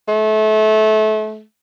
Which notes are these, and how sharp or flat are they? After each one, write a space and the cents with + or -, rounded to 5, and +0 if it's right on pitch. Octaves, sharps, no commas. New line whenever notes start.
A3 -30